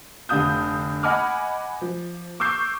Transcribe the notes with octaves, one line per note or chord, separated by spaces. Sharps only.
F1 D3 F5 D#6 G6
D#5 F#5 G#5 B5 D6 F6
F3
C#6 D6 E6 G6 C7